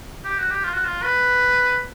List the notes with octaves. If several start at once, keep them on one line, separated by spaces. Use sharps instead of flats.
G4
F#4
G4
F4
F#4
F4
B4